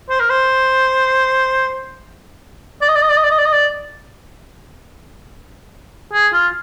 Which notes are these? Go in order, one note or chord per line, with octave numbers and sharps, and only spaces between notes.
C5
A#4
C5
D5
D#5
D5
D#5
D5
D#5
D5
D#5
D5
D#5
D5
G#4
F4